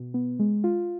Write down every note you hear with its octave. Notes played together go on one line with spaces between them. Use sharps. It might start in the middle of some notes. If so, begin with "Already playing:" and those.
Already playing: B2
B3
G#3
F4